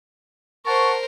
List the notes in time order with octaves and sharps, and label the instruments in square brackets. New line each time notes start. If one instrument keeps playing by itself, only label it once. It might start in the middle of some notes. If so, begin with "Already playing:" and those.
[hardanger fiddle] A#4 C5 [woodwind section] F#5 A5 C#6